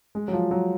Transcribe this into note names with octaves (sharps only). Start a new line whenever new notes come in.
G#3
F#3
F3
F#3